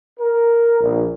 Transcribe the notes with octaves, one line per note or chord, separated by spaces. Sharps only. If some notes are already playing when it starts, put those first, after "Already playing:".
A#4
A#1